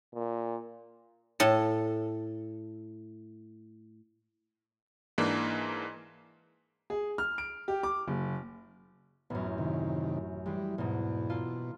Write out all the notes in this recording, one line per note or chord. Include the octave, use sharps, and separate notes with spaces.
A#2
A2 A4
G#2 E3 A#3 D4
G#4
F6
D7
G4
D6
F#1
A1 F#2 B3
C3 D#3
E3 G3 G#3
E2 G#2 B2
A#3 F4 A4